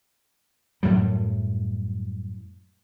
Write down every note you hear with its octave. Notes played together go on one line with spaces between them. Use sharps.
F#2 A2 F#3 G3